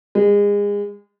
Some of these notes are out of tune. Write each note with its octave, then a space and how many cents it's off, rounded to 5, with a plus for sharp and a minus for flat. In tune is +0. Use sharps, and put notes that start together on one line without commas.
G#3 -30